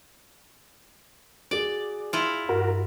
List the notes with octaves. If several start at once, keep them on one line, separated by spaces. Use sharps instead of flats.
F#4 G#4 D5
E4 F4
G2 F#4 A#4